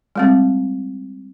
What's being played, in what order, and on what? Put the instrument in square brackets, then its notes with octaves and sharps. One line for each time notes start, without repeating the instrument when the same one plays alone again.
[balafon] G3 G#3 C4